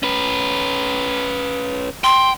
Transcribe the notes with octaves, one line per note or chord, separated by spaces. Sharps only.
C#4 B4
G5 C6